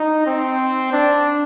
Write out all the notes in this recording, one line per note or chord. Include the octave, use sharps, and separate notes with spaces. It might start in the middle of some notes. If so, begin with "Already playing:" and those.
Already playing: D#4
C4
D4